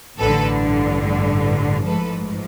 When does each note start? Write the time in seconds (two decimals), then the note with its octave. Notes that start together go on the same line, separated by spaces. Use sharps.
0.18 A1 G2 D3 A4 B4
1.84 A1 G#2 F3 A4 B4